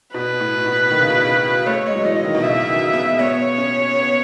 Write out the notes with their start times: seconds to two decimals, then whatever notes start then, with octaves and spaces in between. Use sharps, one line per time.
0.14 B2 B4
0.40 A2
0.66 B2
0.90 D#3
1.00 C#3
1.10 B2
1.20 C#3
1.66 A3 C#5
1.86 G#3
1.95 F#3
2.04 E3 D#5
2.24 D#3
2.35 B2
2.43 C#3 E5
2.68 D#3
2.93 B3
3.19 B3 C#5
3.58 C#4
3.95 B3